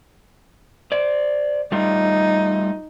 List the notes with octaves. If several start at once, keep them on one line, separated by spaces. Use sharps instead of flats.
C5 D5
G3 A3 D#4 F4